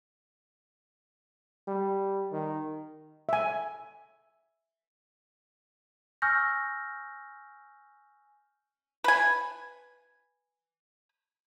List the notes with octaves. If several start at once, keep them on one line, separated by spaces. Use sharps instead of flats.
G3
D#3
E5 G#5
G#5 C#6 E6 F6 G6 A#6
B4 G#5